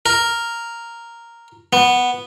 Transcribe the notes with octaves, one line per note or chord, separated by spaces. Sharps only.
A#4
B3